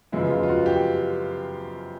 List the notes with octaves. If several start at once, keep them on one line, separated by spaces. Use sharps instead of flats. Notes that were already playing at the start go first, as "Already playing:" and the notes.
F#2 C#3 F3 G#3 B3 E4
F4
F4
F#4
G4